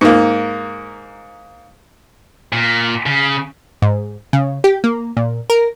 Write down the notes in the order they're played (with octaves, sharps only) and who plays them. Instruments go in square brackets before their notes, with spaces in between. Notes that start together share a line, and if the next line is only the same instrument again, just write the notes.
[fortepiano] G#2 A#3
[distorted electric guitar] A#2
C#3
[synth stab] G#2
C#3
G4
A#3
A#2
A#4